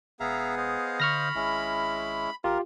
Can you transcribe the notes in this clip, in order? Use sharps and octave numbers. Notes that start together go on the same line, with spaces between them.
E1 B3 G#4 E5 F5 A#5
C5 D#5 F5
D3 B5 C#6 F6 A#6
G#1 G#3 C#4 E4
A1 F4 G4 A#4